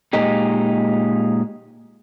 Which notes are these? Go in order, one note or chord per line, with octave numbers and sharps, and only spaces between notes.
A#2 G#3 D#4 G4